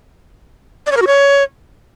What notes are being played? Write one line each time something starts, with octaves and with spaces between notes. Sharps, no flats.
D5
C#5
A#4
F#4
C#5